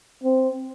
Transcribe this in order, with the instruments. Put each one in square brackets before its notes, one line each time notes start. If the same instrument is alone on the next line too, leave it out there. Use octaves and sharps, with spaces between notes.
[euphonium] C4